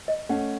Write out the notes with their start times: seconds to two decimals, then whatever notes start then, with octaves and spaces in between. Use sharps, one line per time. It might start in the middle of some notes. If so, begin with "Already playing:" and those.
0.08 D#5
0.29 A3 C#4 F#5